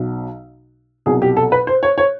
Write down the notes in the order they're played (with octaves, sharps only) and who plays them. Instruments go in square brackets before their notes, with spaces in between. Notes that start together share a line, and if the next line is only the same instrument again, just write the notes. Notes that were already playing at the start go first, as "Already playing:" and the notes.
Already playing: [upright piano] B1 B2 F#3
C2 B2 F#3 G#4
G4
A4
B4
C5
C#5
C#5